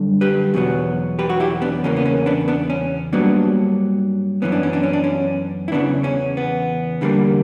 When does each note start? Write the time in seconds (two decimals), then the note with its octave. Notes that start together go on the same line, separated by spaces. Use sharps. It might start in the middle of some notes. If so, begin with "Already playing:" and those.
Already playing: F#2 D3 G3
0.21 G4 B4
0.54 E2 B2 F#3 B3
1.19 G4 B4
1.30 F#4
1.40 E4 G4
1.62 B3 D4
1.84 E2 C#3 E3 A#3 C#4
1.96 B3
2.06 C#4
2.26 B3 D4
2.48 B3 D4
2.70 C#4
3.13 G2 F#3 A#3 B3 D4
4.42 F#2 E3 B3 C#4
4.52 D4
4.63 C#4
4.73 D4
4.83 C#4
4.93 D4
5.04 C#4
5.68 E4
5.72 E2 C#3 E3 B3 D4
6.04 C#4
6.37 B3
7.01 E2 D3 G3 A#3